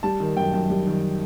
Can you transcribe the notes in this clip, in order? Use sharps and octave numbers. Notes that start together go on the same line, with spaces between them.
G3 A5
D#3
F#2 G5
F#2
G3
D#3